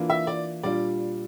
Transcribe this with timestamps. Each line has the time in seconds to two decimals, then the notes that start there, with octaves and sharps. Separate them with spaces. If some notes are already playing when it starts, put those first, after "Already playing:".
Already playing: E3 A#3 D4 F4
0.10 E5
0.27 D5
0.63 A#2 G3 D4 F4 D5